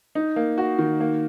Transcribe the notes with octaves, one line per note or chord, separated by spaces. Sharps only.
D#4
A#3
F#4
D#3
A#3